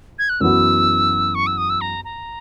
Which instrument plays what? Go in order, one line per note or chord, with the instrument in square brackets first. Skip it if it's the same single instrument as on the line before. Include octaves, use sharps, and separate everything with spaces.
[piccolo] G#6
F#6
[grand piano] F#2 E3 B3 F#4 [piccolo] E6
[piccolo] C#6
E6
D#6
E6
A#5
A#5